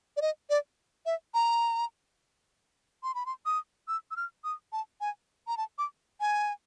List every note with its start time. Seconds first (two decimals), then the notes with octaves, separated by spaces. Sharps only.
0.17 D5
0.22 D#5
0.50 D5
1.06 E5
1.34 A#5
3.03 C6
3.15 B5
3.26 C6
3.46 D#6
3.88 E6
4.11 E6
4.17 F6
4.44 D#6
4.73 A5
5.01 G#5
5.47 A#5
5.57 A5
5.78 D6
6.20 G#5